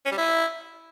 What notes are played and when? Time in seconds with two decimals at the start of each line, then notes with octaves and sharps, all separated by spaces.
0.06 C#4
0.12 G3
0.18 E4